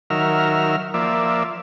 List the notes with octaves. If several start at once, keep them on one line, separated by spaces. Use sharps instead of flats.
D#3 F#3 A#4 E5 F6
F3 A#3 D5 E5